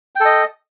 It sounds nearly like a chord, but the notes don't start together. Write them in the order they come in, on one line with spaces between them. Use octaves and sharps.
G5 A4 D#5